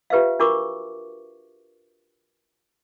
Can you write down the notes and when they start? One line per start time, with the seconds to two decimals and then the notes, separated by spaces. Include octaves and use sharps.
0.10 F4 G4 B4 C5 E5 F5
0.39 D4 F4 F#4 A#4 C#6 D6